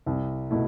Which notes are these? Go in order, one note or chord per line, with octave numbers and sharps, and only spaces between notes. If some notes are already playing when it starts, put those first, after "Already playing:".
C2
B2 A3 E4